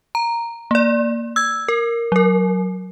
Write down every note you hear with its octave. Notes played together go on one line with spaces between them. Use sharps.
A#5
A#3 D5
E6 G#6
A#4
F#3 A#4